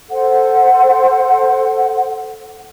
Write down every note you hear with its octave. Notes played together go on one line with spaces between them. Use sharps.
A4 C5 F#5